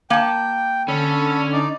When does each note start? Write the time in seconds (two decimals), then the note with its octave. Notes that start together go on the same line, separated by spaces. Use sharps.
0.10 A#3 G5 A5
0.88 D3 C#4 A4 B5
1.52 D#4 D5